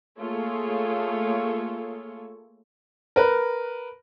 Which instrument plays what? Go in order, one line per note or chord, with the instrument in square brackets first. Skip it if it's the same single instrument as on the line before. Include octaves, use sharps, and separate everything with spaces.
[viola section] A3 A#3 F4 G#4 A4 C#5
[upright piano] A#4 B4